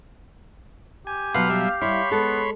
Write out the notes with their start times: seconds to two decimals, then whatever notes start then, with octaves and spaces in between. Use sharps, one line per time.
1.07 G4 G#5
1.34 B2 F#3 B4 F5 F#5 C6
1.50 G3 E5
1.82 G3 E4 C#5 B5 C6
2.11 G#3 B3 A4